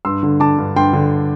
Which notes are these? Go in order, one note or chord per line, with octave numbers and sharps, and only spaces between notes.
G2 C6 E6
D3
D3 A5 D6
G2
G2 G5 C6
D3